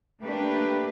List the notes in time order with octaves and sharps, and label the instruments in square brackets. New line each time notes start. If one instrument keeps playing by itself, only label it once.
[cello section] A3 A#3 D4 G4 B4